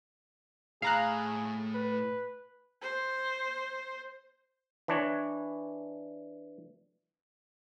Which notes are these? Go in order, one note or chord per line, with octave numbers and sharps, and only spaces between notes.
A2 G#4 F5 A#5 B5 F#6
B4
C5
E3 D4 C#5